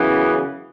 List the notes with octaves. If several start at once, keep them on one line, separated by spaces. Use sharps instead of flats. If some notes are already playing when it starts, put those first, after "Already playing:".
Already playing: F#2 C#3 E3 B3